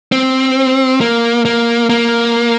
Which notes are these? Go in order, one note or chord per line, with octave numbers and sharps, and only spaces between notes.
C4
A#3
A#3
A#3